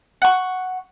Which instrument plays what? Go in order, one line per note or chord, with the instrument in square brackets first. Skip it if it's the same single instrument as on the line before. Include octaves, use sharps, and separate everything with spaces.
[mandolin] F#5 C#6